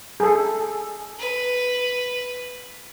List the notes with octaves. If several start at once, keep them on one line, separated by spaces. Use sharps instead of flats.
G#4 A4
B4